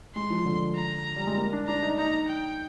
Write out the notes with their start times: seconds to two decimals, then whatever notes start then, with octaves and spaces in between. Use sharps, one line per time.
0.15 G#3 C6
0.30 F3
0.45 D3
0.76 A#5
1.16 G3
1.27 G#3
1.37 A#3
1.53 D4
1.68 D4 A#5
1.82 D#4
1.98 D#4 A#5
2.29 G5